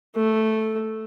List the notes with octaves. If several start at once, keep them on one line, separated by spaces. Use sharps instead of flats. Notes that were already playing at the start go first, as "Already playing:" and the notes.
A3